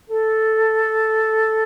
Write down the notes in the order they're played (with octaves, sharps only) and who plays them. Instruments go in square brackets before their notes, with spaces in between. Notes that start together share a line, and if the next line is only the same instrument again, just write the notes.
[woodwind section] A4